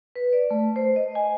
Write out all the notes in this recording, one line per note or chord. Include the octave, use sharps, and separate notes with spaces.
B4
D5
A3
C5
D#5
G#5